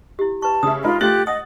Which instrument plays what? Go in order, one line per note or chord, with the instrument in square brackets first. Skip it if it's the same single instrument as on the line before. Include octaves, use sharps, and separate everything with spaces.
[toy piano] E4 G4
[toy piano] B4 C#6 [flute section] A5
[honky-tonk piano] C#3 E5 [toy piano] D#6
[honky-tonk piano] G#3 D#4 A#4 [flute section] F4 B5
[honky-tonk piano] A3 A6 F#7 [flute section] F4 G4 F#6
[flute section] D#5 [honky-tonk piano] F#5 [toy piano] D#6